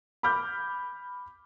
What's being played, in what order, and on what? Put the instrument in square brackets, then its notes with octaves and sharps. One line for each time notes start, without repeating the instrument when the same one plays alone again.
[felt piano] B5 D6 F6 G6